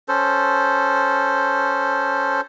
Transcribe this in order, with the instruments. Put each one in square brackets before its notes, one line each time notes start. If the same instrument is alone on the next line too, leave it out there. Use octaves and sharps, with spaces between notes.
[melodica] C#4 A4 C5